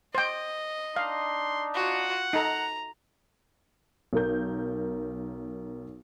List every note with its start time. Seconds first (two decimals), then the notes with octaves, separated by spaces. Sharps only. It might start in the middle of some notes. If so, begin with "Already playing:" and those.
0.15 C5 D#5 G5
0.96 D4 D#4 F5 C6
1.74 F4 F#4 F#5
2.33 D#4 A4 A#5
4.13 B1 A#4 G6